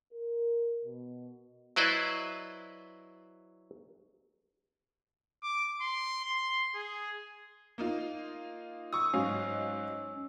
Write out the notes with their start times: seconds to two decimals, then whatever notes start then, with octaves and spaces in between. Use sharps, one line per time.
0.13 A#4
0.84 B2
1.76 F#3 E4 B4 C5 D5 D#5
5.43 D6
5.81 C6
6.25 C6
6.75 G#4
7.78 A#3 D#4 F4
8.93 C#6 D#6 E6
9.13 G#2 F#3 C#4 F5